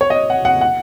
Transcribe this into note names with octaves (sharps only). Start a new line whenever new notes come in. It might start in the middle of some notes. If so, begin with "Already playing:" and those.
C#5
D#5
F#5
F#5
F#5